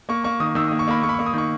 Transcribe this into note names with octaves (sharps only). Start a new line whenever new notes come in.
A#3 C#6
A#3 C#6
D#3 D#6
D#3 E6
D#6
A#3
C#6
A#3 B5
A#3 C#6
B5
C#6
A#3
D#6
D#3 C#6